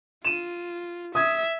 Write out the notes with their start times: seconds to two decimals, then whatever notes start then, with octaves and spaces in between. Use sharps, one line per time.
0.25 F4 D#7 E7
1.15 E5 D#6 G#6